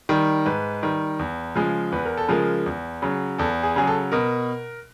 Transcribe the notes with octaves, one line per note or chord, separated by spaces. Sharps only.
D#3 G3
G#2 B4
D#3 G3
E2
C#3 F3 G#3
E2 B4
A#4
A4
C#3 F3 G#3 A#4
E2
C#3 F#3
E2 A4
G#4
C#3 F#3 G#4
A4
B2 A#4